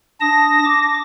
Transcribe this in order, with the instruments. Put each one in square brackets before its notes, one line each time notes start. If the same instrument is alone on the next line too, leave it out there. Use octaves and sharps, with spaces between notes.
[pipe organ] D4 A5 D#6 [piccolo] A#6
[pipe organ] D6